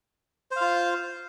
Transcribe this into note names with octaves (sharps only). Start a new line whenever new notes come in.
F4 C5 F5